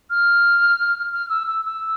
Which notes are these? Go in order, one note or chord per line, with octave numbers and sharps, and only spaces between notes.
F6
F6
E6
E6
E6